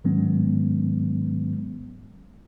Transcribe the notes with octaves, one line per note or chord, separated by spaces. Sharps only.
G#2 D#3 F#3 G#3 B3 C#4